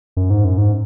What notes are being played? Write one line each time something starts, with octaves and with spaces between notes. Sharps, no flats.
F#2
G#2
F#2
G#2